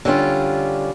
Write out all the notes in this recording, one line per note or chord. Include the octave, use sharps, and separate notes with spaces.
D3 G3 C#4 F4